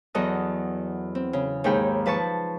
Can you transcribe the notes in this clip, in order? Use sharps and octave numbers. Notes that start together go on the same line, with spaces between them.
E2 F#3 F#4 A4 D#5
C4
C#3
D#2 G#2 D#4 G#4 G5 B5
F3 B4 A5 C#6